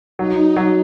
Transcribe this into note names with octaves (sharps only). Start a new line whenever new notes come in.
F#3 D#4
F#3